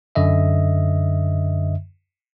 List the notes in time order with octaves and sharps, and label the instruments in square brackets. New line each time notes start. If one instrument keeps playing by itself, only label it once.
[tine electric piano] F#2 D3 D#5 E5